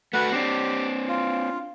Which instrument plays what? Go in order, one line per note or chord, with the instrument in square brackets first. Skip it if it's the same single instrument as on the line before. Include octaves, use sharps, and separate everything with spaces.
[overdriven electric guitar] A3 F#4 [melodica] B4 F#5
[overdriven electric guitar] C4 D4 [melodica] G4
[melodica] F4